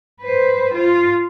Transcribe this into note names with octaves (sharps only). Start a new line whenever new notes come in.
B4 C5
F4